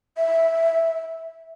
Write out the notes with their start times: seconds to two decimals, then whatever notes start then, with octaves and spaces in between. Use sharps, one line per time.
0.17 E5